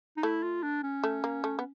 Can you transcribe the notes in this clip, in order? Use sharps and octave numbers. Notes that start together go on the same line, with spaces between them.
D#4
A3 E4
F4
D4
C#4
A3
A#3
A3
B3